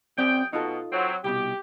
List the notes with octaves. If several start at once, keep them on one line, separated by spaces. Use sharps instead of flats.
F#2 C4 G#4 D5 G5
B2 D#4 F4 A4
F#3 C4
C2 B2 G4